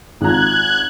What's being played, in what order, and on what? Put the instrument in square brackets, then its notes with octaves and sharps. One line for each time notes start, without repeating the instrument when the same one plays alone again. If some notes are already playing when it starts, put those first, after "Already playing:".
[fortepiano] G#1 F4 A#5 [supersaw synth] F#6 G#6